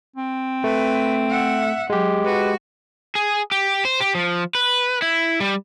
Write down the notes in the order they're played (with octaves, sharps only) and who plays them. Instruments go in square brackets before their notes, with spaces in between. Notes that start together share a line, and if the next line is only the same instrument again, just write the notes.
[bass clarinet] C4
[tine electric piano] A3 [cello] B4
[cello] E5 F#5
[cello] F#3 [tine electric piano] G#3 G4
[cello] F#4 [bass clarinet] B4
[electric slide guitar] G#4
G4
C5
G4
F3
B4
E4
G3